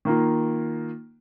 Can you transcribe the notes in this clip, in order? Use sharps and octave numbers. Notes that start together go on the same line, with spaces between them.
D#3 A#3 F4